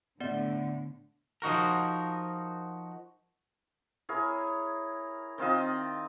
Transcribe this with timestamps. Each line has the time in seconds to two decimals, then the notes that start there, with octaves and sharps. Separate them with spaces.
0.20 A2 D3 B3 D5 F#5
1.42 F3 D#4 F#4 A#4
4.09 E4 G#4 A#4 C#5
5.38 D#3 C4 F4 D#5